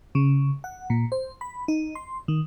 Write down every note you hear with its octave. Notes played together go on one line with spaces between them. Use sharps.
C#3
F#5
A#2
C5
B5
D#4
C6
D#3